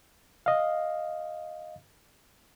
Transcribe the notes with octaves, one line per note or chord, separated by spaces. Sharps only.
D#5 F5